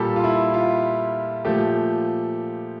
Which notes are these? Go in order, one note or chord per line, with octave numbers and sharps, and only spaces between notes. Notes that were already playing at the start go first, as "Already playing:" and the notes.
Already playing: A#2 G3 A#3 G4 A4
F4
E4
F4
A#2 F3 A3 G4